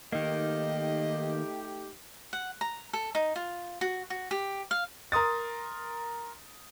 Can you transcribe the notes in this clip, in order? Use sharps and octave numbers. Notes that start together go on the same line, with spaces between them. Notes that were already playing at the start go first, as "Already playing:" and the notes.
D#3 A3 A#3 D#4 G4 D#5
F#5
A#5
A4
D#4
F4
F#4
F#4
G4
F5
A#4 C6 D#6 A6